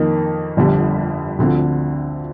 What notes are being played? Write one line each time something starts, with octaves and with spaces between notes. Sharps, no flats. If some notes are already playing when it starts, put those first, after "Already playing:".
Already playing: F2 D#3 A#3 D#4
G1 F2 D3 G3
D2 D3 F3 C4